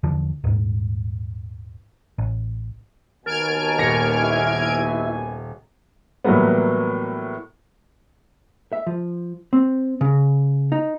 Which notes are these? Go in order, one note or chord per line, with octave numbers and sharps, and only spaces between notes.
E2 D3 F3
D#1 G#2
A1
D#2 B2 A#4 G#5 A5 F6 G#6 D7
D#1 A#6 C#7
E4 E5
A2 E3 F#3 G3 A#3 B3
E5
F3
C4
C#3
D#4